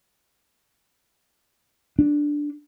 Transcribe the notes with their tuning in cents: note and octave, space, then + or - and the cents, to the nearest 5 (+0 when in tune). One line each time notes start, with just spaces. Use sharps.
D4 +0